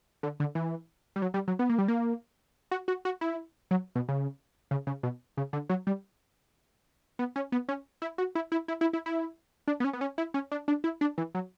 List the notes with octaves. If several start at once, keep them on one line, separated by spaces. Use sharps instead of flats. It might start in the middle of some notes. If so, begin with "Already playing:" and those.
D3
D3
E3
G3
F#3
G3
F#3
B3
A#3
G3
A#3
F#4
F#4
F#4
E4
F#3
B2
C#3
C#3
C#3
B2
C#3
D3
F#3
G3
B3
C#4
B3
C#4
E4
F#4
E4
E4
E4
E4
E4
E4
D4
B3
C#4
B3
C#4
E4
C#4
D4
D4
E4
D4
E3
F#3